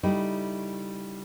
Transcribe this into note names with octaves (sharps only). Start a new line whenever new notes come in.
C#3 G3 A3 D#4 E4